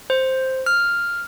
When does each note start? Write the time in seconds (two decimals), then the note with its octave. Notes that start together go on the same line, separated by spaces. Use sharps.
0.10 C5
0.66 F6